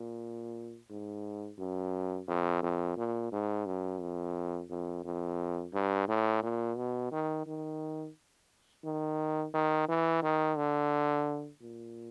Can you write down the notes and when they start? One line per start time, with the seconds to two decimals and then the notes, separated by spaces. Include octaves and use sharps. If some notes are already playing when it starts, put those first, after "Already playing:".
Already playing: A#2
0.90 G#2
1.59 F#2
2.28 F2
2.63 F2
2.97 A#2
3.32 G#2
3.66 F#2
4.01 F2
4.70 F2
5.04 F2
5.73 G2
6.08 A2
6.43 A#2
6.77 B2
7.12 D#3
7.47 D#3
8.84 D#3
9.54 D#3
9.89 E3
10.23 D#3
10.57 D3
11.61 A#2